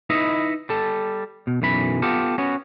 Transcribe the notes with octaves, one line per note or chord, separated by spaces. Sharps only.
D#4 E4 B4 D#5 E5
G3 A4
B2
B1 F#2 E3 B5
B3 F4 G4 A4
B3 C#4 F#4